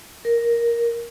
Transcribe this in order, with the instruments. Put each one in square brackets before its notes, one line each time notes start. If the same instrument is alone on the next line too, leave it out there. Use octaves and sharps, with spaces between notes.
[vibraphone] A#4